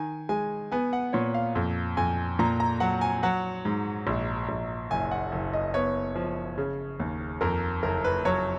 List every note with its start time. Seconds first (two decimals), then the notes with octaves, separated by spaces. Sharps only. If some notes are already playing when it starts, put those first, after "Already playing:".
Already playing: D#3 G#5
0.29 G#3 G#5
0.72 B3 G#5
0.93 F#5
1.13 A#2 C#5
1.34 F5
1.55 F2
1.97 F2 G#5
2.39 A#2 A#5
2.60 A#5
2.80 F#3 F#5
3.01 G#5
3.23 F#3 F#5
3.65 G#2
4.07 A#1
4.49 A#1
4.91 F#1 G#5
5.11 F#5
5.32 F#1
5.53 D#5
5.74 B3 C#5
6.15 F3
6.58 C#3
7.00 D#2
7.41 F2 A#4
7.83 F#1 A#4
8.04 B4
8.25 F#3 C#5